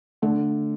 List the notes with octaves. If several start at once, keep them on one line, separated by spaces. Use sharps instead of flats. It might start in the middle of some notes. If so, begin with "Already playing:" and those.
D3 A3